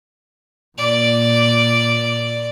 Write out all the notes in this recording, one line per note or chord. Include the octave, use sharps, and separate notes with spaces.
A#2 D5